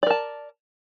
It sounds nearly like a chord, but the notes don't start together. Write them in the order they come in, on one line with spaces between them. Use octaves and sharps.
D5 A#4 A5